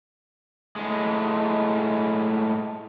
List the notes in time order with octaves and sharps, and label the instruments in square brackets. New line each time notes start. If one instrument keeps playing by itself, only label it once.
[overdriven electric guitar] A2 G#3